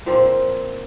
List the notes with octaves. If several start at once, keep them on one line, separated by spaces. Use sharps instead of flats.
A#2 F3 C4